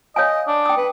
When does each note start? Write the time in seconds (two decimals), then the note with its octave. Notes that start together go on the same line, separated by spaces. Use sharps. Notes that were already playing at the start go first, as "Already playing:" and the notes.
0.16 C#5 D#5 F5 G#5
0.48 D4
0.66 G5 D#6
0.78 B4